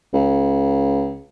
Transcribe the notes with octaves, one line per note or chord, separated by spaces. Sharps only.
C#2